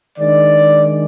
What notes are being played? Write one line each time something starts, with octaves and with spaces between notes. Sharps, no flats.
D#3 G#3 D4 D5